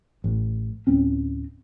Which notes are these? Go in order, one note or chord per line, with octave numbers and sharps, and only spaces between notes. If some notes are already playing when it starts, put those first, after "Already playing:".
A1
D1 C4 C#4